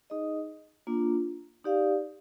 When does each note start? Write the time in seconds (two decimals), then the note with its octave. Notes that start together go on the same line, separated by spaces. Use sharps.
0.10 D#4 G#4 D#5
0.87 A#3 D4 F4
1.64 D#4 G4 D5 F5